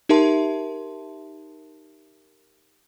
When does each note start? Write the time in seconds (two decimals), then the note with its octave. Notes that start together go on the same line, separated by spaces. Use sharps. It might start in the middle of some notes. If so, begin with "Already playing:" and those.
0.09 D#4 G4 A#4 E5 A5 C6